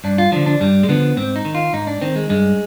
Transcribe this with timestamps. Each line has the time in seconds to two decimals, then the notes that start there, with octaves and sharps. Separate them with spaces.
0.04 G2 D4
0.18 F4
0.32 D3 F3 D4
0.46 D4
0.60 G2 G3
0.83 G#3
0.89 D3 F3 B3
1.17 G#2 C4
1.36 D#4
1.45 D#3
1.55 F4
1.73 G#2 D#4
1.87 D4
2.02 D#3 C4
2.16 G#3
2.29 G2 G#3